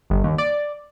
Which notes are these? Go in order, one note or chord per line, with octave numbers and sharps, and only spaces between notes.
G1
D#2
D5